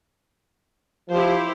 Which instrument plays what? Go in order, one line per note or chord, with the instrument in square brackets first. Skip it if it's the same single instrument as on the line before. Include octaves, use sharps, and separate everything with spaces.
[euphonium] F3 [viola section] E4 G4 C5